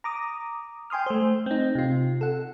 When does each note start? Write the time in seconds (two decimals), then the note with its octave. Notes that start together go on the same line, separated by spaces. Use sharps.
0.04 A#5 D6 D#6
0.90 G5 G#5 C6 D#6 F6
1.06 A3 C5
1.46 C4 D#4
1.75 C3 F4
2.21 A4 F#5